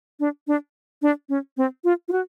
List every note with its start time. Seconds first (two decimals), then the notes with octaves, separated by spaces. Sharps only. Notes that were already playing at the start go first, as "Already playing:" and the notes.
0.20 D4
0.47 D4
1.02 D4
1.29 C#4
1.57 C4
1.84 F4
2.08 F4
2.12 F#4